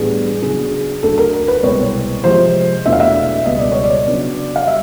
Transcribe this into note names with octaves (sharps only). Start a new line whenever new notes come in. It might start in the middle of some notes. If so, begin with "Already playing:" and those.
Already playing: A2 E3 G3 B3 D4 G#4
C#3 F#3 B3 D4 G#4
D2 D3 F#3 A4
A#4
A#4
B4
C2 B2 G#3 C4 C#5
C3 F3 G#3 C5
E2 B2 F#3 A3 D4 E5
F5
E5
C#2 B2 G3 D#5
D5
C#5
D5
C#3 F#3 B3 D4
F5
G3 E5